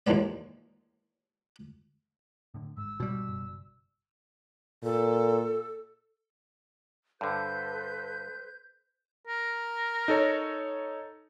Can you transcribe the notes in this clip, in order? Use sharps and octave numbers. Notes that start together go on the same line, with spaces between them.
A#1 D#2 E3 G#3 B3 D5
A2 D3
G#1 G#2 G#3 E6
B2 G3
F#1
A#2 A4
G2 D3 A4 B4 C5 G6
A#4
D#4 A4 C#5